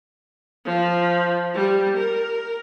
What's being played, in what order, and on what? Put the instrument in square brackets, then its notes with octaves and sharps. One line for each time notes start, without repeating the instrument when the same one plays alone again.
[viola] F3
G3
A#4